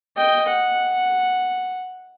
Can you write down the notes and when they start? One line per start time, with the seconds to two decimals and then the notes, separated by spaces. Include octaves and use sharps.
0.17 D#5 G5
0.47 F#5